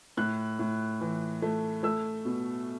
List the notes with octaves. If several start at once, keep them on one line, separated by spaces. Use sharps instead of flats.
A2 F#6
A2
E3
A3
A3 E6
B2